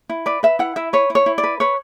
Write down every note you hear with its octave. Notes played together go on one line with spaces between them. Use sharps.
E4
B4 D5
B4 E5
E4 F#5
E4 E5
B4 C#5
E4
C#5
E4
D5
B4
B4 C#5